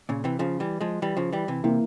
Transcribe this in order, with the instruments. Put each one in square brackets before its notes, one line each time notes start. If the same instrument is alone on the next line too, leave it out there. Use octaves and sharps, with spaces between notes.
[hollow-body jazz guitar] A#2 C#3
C3 E3
C#3 F3
E3 G3
F3 G#3
E3 G3
C#3 F3
E3 G3
C3 E3
[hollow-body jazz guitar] C3 [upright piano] E3 A#3 E4